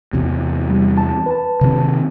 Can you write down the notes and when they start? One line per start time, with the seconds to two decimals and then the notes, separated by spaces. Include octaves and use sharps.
0.13 E2 C3
0.70 G3
0.98 A5
1.26 B4 A5
1.61 C3 D#3 C4